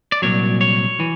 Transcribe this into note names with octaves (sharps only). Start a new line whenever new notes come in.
D5
C2 A#2 F#3 C#5
C#5
E3